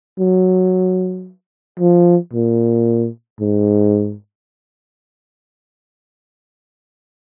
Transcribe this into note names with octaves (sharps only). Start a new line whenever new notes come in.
F#3
F3
A#2
G#2